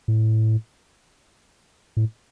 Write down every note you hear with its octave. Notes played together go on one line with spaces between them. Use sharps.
A2
A2